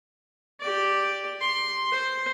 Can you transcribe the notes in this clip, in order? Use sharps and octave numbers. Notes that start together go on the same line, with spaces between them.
G4 D5
C6
C5